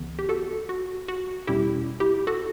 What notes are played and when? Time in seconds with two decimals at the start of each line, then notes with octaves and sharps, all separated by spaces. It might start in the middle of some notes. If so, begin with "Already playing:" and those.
Already playing: C#2 C#3 E3 B3
0.19 G4
0.29 F#4 A4
0.69 F#4
1.08 F#4
1.47 E2 B2 G3 C#4 E4 G4
2.00 E4 G4
2.27 F#4 A4